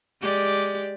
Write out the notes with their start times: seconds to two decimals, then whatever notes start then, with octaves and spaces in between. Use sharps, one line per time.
0.21 G#3 G4 D5